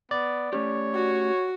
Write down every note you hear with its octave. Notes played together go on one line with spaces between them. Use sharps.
B3 D5
A3 C#4 G4 C#5
F#4